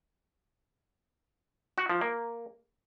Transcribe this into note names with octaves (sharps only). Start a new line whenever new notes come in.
F#4
F3
A#3